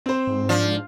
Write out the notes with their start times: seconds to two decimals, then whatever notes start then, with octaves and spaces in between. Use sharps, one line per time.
0.06 C4 C5
0.27 G#2
0.49 F3 D4